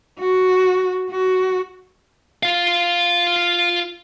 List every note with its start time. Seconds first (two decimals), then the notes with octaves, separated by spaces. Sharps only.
0.20 F#4
1.10 F#4
2.43 F4 F5